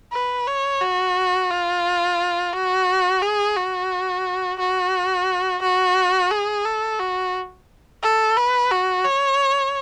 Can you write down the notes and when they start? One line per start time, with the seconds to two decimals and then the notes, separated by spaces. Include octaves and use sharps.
0.13 B4
0.47 C#5
0.81 F#4
1.50 F4
2.53 F#4
3.22 G#4
3.56 F#4
4.59 F#4
5.62 F#4
6.31 G#4
6.65 A4
6.99 F#4
8.03 A4
8.37 B4
8.71 F#4
9.05 C#5